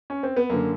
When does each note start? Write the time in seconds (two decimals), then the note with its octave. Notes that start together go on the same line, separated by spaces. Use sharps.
0.10 C#4
0.23 C4
0.36 B3
0.50 F#2 D3 A#3